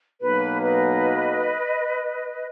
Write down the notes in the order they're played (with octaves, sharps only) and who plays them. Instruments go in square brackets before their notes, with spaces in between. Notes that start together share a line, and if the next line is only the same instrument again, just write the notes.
[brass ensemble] B1 B2 A#3 [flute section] B4
[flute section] B4 D#5